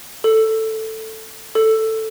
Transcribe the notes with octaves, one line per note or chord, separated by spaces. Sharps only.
A4
A4